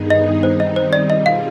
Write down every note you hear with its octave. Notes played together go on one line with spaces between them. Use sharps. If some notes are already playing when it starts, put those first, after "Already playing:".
Already playing: G2 D#3 B3 D#4 G#4
D#5
D#3 G3 C4 D#4 C5
D#5
C5
D5
B2 G3 C4 F4 G#4 D#5
F5